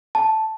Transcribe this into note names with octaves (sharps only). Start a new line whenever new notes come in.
A5